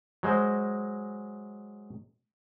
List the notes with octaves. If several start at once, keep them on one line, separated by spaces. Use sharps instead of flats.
F#3 G#3 C5 D#5